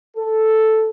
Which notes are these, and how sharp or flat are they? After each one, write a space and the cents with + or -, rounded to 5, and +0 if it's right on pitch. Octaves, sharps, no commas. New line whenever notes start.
A4 +0